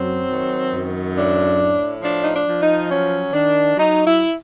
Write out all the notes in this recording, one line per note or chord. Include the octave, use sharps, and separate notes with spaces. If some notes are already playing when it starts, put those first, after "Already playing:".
Already playing: F#2 F#3 C4
D#3
F#2
A2 D4
A2
F3 D4
D#4
D4
F3
D#4
F#3 C#4
D#3 D4
F#3 D#4
E4